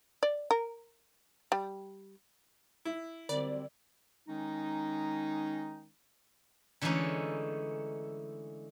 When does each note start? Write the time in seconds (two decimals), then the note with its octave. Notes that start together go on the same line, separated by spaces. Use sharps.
0.23 D5
0.51 A#4
1.52 G3
2.85 E4
3.29 D3 F#3 G3 C4 D5
4.29 D#3 G#3 C#4 D#4
6.82 D3 E3 G#3 A3 C#4 D#4